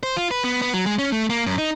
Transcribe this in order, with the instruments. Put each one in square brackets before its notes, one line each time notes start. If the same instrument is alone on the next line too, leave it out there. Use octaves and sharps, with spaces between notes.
[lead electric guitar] C5
F4
B4
B3
B3
F#3
G#3
C#4
A3
A#3
F#2
D#4